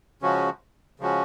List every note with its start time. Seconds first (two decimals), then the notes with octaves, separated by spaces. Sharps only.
0.22 C#3 F3 G#3 C#4 F#4
1.00 C#3 F3 G#3 C#4 F#4